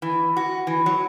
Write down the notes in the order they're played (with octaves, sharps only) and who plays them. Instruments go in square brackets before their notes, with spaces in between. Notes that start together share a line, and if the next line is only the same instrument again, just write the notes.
[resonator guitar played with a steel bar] E3
F#4
E3
F#3